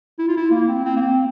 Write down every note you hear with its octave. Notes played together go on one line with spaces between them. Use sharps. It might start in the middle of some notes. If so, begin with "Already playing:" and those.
E4
F4
E4
A#3
C4
C4
A#3
C4